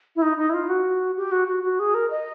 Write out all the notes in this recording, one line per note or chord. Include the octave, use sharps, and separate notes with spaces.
E4
D#4
D#4
E4
F4
F#4
G4
F#4
F#4
F#4
G#4
A#4
D#5